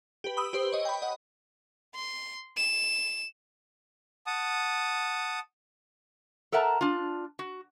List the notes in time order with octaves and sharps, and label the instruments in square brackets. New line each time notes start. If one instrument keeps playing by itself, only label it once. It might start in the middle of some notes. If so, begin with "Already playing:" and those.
[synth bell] G4 B4
B5 D#6 E6
G4 B4 C5
C#5 D#5
G5 B5
D#5 F#5
[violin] C6
E7
[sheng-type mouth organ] F#5 A5 D#6
[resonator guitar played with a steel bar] A4 A#4 E5 F#5 A5 A#5
D4 F4
F#4